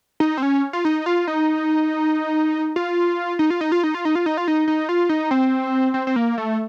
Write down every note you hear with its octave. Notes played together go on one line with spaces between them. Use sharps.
D#4
C4
C#4
F4
D#4
F4
D#4
F4
D#4
F4
D#4
F4
D#4
F4
D#4
F4
D#4
F4
D#4
D#4
F4
D#4
C4
C4
C4
A#3
A3